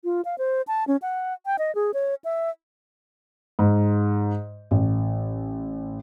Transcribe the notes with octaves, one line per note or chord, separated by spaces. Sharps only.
F4
F5
C5
A5
C#4
F#5
G5
D#5
G#4
C#5
E5
G#2
A1